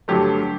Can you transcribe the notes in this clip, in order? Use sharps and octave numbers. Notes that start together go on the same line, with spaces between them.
G2 D3 F#3 A3 G4